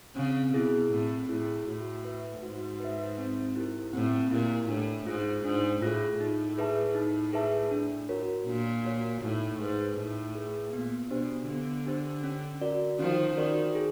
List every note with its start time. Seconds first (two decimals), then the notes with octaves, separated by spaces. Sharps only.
0.15 C#3 C4
0.53 B2 E4 G#4
0.91 A2 C4
1.29 A2 E4 G#4
1.67 A2 F#4
2.05 B4 E5
2.42 G#2 F#4
2.80 B4 E5
3.18 C4
3.56 E4 G4 A#4
3.93 A2 C4
4.31 A#2 E4 G4 A#4
4.69 A2 D4
5.06 G#2 F4 G#4
5.44 G#2 D4
5.82 A2 F4 G#4
6.20 A2 D#4
6.58 G#4 B4 E5 A5
6.95 D#4
7.33 G#4 B4 E5 A5
7.71 D4
8.09 F#4 A#4 C#5
8.47 A#2 D4
8.84 F#4 A#4 C#5
9.22 A2 D#4
9.60 G#2 G#4 B4
9.97 A2 D#4
10.35 G#4 B4
10.73 A#2 B3
11.10 B2 D4 G4 C5
11.48 D3 B3
11.86 D4 G4 C5
12.24 C#4
12.61 F#4 A#4 D5
12.99 D#3 F3 C#4
13.37 D#3 F#4 A#4 D5
13.75 G#4